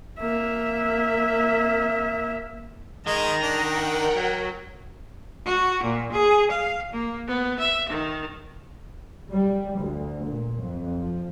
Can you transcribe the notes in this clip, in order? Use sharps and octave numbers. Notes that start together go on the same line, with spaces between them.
A#3 E5
D#3 G#3 D#5 A#5
D4 A#4 F#5 G5
F#3
F#4
A#2
G#4
F5
A#3
B3
E5
D#3
G3
D2
A#2
F2
F3